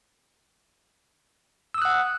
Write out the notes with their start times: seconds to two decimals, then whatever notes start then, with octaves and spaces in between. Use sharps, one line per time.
1.74 E6
1.78 D#6
1.82 F#6
1.85 F#5